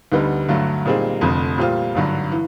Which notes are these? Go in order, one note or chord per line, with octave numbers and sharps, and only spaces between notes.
D2 D3 G3 B3 D#4
G2 D3 F#3 A3
A#2 G3 C4 D#4 G#4
F1 F2 D3
A#2 G3 C4 F4
G#1 G2 D3 F#3
E3